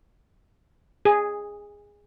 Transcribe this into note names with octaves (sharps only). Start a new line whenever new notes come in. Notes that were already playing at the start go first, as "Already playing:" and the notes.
G#4